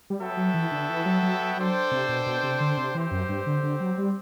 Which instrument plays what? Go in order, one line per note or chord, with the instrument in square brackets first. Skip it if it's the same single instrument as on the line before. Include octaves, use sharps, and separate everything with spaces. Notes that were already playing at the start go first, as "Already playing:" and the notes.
[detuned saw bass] G3
[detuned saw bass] F#3 [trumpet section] B3 F#4 A4 E5 G5
[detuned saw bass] F#3
E3
D3
E3
F#3
F#3
F#3
[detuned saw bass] F#3 [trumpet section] D4 A4 C5 G5
[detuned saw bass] C3
B2
B2
C3
D3
C3
[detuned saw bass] E3 [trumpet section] C4 G4 C5
[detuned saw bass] F#2
G2
D3
D3
F#3
G3